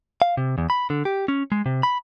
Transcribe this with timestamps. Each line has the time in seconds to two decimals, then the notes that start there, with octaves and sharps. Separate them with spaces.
0.22 F5
0.37 C3
0.58 E2
0.70 B5
0.90 D3
1.05 G4
1.28 C#4
1.52 G#3
1.66 C3
1.83 B5